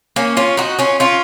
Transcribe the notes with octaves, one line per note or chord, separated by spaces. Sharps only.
A#3 C#4
C#4 F4
D#4 F#4
C#4 F4
C#4 F4